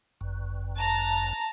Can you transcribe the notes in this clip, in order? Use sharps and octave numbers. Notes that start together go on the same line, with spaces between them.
G1 F#2
A5 A#5